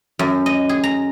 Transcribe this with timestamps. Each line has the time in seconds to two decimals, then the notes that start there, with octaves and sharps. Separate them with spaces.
0.19 F#2
0.46 D#5
0.69 G#4
0.84 A#5